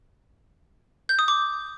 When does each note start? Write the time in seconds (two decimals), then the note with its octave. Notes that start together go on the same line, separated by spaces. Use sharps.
1.09 G6
1.19 D#6
1.28 D6